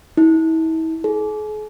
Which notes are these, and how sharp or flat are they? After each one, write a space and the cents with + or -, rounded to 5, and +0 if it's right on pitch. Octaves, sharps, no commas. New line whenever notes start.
E4 -40
G#4 +45